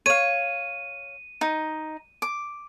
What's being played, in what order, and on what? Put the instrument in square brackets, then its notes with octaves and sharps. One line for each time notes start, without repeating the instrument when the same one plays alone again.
[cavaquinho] C#5 F5 [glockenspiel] D#7
[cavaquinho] D#4
D6